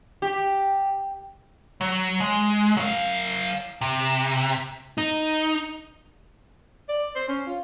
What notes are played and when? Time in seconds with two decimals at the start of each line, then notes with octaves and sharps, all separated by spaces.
0.22 G4
1.81 F#3
2.20 G#3
2.77 F#3 F5
3.81 C3
4.98 D#4
6.89 D5
7.15 C5
7.28 C#4
7.47 F4